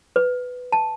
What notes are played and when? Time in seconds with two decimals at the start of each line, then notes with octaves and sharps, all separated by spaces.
0.16 B4
0.72 A5